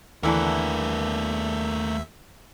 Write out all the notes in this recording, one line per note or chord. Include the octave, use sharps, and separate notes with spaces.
D#2 D3 E3 A3 D4 A#4 E5